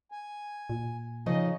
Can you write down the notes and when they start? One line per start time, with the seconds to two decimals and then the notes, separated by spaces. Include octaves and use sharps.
0.11 G#5
0.70 A#2
1.26 C#3 F3 C#4 D#4 D#5